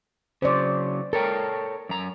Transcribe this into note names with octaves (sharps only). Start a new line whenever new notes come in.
C#3 F#3 C5 D5
A4 A#4 C#5 G5
F#2 A#5